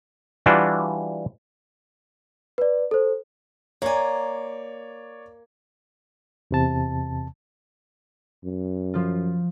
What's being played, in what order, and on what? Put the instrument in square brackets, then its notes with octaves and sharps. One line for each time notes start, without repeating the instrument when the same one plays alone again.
[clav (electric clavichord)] E3 G3 D4 F4 F#4
[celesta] B4 D5
A4 C5
[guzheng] A#3 G#5 [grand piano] C#5 D5
[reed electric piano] E2 C3 A5
[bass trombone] F#2
[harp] F3 F4